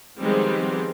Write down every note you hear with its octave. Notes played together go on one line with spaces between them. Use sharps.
D#3 F3 G3 G#3 B3 C4